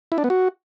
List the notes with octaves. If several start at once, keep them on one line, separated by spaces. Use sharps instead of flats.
E4
D4
B3
F#4